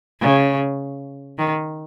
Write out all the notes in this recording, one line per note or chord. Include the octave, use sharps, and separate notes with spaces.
C#3
D#3